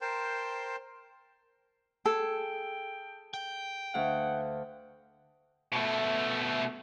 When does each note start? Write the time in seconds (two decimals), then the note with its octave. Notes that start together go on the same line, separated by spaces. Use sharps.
0.01 A#4 C5 G5 A5 C6
2.06 G#4 A4 G5
3.34 G5
3.94 D2 F5 F#5
5.73 B2 A3